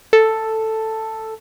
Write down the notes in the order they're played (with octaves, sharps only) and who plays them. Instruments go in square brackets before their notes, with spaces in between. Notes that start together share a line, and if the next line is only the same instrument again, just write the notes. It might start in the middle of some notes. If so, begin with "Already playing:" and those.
[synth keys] A4